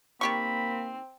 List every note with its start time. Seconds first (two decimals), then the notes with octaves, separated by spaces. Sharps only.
0.21 D#3 A#3 C4 G4 B5 C#6